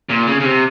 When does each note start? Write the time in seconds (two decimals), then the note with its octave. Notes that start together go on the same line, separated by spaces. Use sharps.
0.09 A#2
0.27 C#3
0.40 C#3
0.45 C3